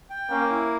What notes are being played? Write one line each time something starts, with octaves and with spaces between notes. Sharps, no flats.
G5
A#3 C#4
E4